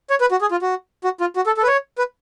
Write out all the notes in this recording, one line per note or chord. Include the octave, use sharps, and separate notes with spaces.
C#5
B4
F#4
G#4
F4
F#4
F#4
F4
F#4
A4
A4
B4
C#5
B4